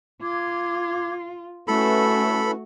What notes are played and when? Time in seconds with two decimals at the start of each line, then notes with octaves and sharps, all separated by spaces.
0.22 F4 D6 G#6
1.68 A3 C#4 E4 F#4 A4 B4 B5